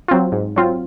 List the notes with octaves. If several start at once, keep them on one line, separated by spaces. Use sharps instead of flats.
F#3 C4 F4
G#2
F#3 C4 F4